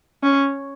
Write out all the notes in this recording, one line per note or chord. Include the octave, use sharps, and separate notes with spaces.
C#4